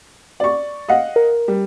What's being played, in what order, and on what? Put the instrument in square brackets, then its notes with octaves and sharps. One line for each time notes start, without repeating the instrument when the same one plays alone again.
[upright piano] D5 C#6
D#5 F5 F#5
[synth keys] A#4
[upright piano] G3